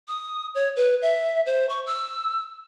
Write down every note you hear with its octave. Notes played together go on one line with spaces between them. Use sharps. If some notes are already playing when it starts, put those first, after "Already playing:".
D#6
C#5
B4
E5
C5
C#6
E6